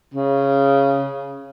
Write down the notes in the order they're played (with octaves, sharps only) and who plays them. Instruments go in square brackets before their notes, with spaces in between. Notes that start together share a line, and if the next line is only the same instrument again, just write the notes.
[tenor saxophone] C#3